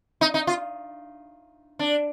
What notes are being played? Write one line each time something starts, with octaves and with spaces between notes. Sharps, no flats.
D#4
D#4
F4
D4